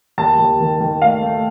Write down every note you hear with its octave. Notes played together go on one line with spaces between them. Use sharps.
D#2 A5
D#2
D#3
D#3
A3 F5
A3